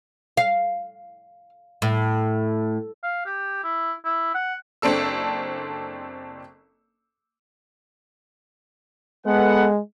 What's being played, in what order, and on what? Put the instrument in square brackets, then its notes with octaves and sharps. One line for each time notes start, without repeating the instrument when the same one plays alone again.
[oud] F5
A2
[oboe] F5
G4
E4
E4
F#5
[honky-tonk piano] F#1 C4 D4 A4 E6
[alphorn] G#3 [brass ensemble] B3 A4 F#5